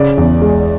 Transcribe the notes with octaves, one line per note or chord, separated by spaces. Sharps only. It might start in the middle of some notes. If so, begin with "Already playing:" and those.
Already playing: C#3 D5
E2
G#3